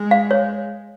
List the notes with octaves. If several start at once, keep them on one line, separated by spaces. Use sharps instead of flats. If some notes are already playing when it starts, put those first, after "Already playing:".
Already playing: G#3
F5
C#5